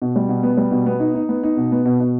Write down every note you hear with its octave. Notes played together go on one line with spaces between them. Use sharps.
B2
G3
B2
B3
G3
B2
B3
D#4
D#4
B3
D#4
B2
B3
B2
B2